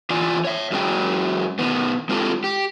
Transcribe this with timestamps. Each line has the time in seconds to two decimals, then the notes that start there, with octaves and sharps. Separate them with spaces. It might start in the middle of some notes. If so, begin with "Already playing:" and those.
0.10 E3 F4 D5 G#5
0.45 C#5 E5
0.71 F#2 F#3 G#3 C#4 F#4 G5
1.59 B2 D#3 B3
2.09 G#3 C4 F4 G4 A4
2.44 G4